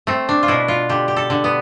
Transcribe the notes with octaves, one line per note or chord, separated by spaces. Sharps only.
A3 C4
D4
F4
B2 E4
F4
D3 G4
G4
A4
D3
B3